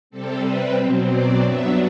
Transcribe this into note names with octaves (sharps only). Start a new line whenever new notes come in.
C3 G3 C4 A4
B4
B2 F#3 C4
D5
G2 F#3 B3 D4 E5